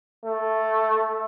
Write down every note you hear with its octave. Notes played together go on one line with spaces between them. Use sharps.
A3